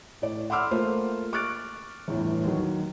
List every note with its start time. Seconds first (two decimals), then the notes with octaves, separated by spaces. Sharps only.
0.22 A2 D5
0.50 F#5 B5 C6 D6 E6 F6
0.71 A3 A#3 F4 C5
1.33 C#6 D6 F6 F#6 A6 D7
2.08 G1 E2 A2
2.44 D#2 D#3 F#3